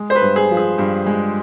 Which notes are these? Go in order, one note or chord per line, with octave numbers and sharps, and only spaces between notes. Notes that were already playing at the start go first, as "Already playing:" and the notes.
Already playing: G#3
C5
B4
G2
G#4
F3
G#4
G2
G#3